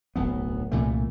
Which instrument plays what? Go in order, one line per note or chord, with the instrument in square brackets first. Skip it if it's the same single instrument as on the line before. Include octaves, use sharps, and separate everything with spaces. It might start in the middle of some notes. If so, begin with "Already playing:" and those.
[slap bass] D1 B1 B3
C2 A#2 E3 A3